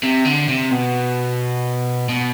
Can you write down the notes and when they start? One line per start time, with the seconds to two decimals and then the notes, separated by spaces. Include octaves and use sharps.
0.04 C3
0.25 D3
0.49 C3
0.72 B2
2.09 B2